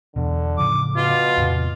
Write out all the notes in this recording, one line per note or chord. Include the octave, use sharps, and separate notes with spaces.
E2 B2 D3
A2 C#3 F3 D6
B2 F4
E2 A2 C3